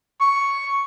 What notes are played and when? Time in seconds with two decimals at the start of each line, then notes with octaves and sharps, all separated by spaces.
0.21 C#6